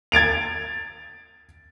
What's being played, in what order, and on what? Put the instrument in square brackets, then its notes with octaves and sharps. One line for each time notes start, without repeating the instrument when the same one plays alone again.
[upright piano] G#6 A6 D7 F7